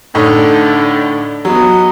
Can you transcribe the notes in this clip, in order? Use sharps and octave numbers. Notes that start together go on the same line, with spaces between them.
A2 D3 D#4
F#3 B3 D#5